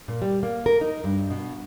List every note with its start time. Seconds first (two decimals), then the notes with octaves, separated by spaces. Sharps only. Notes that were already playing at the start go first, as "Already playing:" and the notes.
0.08 A#2
0.22 G3
0.43 A#3
0.66 A#4
0.81 D#4
1.04 G2
1.30 B2